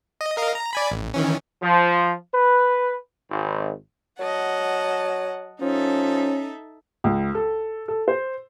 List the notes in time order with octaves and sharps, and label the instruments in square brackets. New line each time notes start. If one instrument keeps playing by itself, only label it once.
[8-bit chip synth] D#5
A#4 D#5 F5
A#5
D5 G#5 B5
A1
D#3 E3 C#4
[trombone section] F3
B4
G#1
[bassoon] F#3 [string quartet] D#5 F#5 A5
[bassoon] F3 [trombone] C#4 [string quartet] D#4 A4 E5
[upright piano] C#2
A4
A4
C5